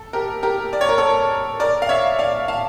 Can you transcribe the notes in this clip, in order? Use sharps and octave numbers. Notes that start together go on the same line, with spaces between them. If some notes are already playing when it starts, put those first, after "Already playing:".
Already playing: A4
G4 A#4
G4 A#4
D5
C#5
A#4
A4 C#5
A#4 D5
F5
C#5 E5
D5 F5
F5 A5